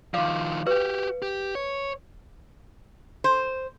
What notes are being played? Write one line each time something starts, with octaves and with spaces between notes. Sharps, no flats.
D#3 F3 F5 D6
F#4 G4 B4
G4
C#5
C5